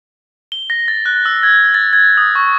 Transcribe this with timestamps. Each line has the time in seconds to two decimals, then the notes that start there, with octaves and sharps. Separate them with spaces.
0.52 G7
0.70 A#6
0.88 A6
1.06 F#6
1.26 E6
1.43 G#6
1.74 A6
1.93 G#6
2.17 D#6
2.35 C#6